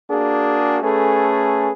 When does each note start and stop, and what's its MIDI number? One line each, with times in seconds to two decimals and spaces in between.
0.10 0.78 58
0.10 0.78 62
0.10 0.78 66
0.10 0.78 68
0.83 1.71 57
0.83 1.71 61
0.83 1.71 68
0.83 1.71 69
0.83 1.71 71